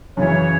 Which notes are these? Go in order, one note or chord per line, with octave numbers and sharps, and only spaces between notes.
F#2 C#3 E3 C#5